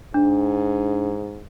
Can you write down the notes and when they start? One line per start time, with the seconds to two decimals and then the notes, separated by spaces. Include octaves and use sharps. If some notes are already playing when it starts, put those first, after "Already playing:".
0.14 G#2 D4